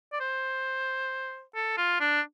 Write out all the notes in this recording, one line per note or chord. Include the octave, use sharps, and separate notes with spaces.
D5
C5
A4
F4
D4